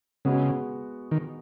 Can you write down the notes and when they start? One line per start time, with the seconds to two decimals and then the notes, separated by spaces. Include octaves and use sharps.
0.25 C#3 G#3 B3 F#4
1.11 D#3